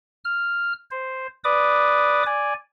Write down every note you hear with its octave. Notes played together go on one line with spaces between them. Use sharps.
F6
C5
B4 D5 D6 D#6
D5 G#5